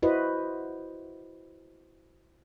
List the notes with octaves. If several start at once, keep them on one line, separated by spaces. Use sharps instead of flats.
E4 F#4 B4 C5 D#5